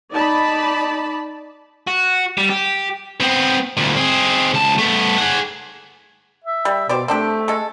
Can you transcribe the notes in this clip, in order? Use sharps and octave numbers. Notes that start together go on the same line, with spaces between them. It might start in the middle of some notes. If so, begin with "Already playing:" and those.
D#4 D5 A5 B5
F#4
G3
G4
B3 C4
D2 A#2
C4 G#4
C#2 A5
A3 B3
G#4 F#5
E5
G3
B2 G4 C5 D5
A3 C4 D4 G4
G#3 A4